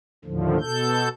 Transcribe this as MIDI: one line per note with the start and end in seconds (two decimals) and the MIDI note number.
0.25 0.58 39
0.25 0.58 45
0.25 0.58 50
0.25 0.58 53
0.61 1.09 47
0.61 1.09 69
0.61 1.09 91